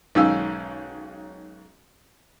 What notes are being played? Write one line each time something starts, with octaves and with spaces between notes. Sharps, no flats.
B1 G#2 D#3 C#4 F5 E6